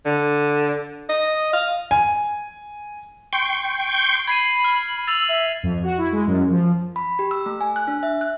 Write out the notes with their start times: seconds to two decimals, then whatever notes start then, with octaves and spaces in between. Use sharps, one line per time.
0.05 D3
1.09 D#5
1.53 F5
1.91 G#5
3.33 G5 C6 C#6
4.27 B5 G#6 C7 D#7
4.64 F6
5.07 E6 A6 F7 F#7
5.29 E5
5.63 F2
5.83 F#4
5.98 E4
6.13 G#3
6.27 F#2
6.50 F3
6.96 B5
7.19 G4
7.31 E6
7.46 A3
7.61 G#5
7.76 F#6
7.88 D4
8.03 E5
8.21 F#6